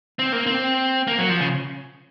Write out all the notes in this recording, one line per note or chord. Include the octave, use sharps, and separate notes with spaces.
C4
A#3
C4
A#3
F#3
F3
C#3